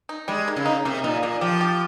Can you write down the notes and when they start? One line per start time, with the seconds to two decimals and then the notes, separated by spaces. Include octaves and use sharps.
0.09 D#4
0.28 G3 G#3
0.48 D#3
0.56 C#3
0.66 D#4
0.85 C3 A#3
1.04 A#2 D#4
1.23 A#2 A#3
1.41 F3 G4
1.61 G4